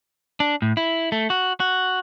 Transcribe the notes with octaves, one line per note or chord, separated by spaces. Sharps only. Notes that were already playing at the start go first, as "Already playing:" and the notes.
D4
A2
E4
A3
F#4
F#4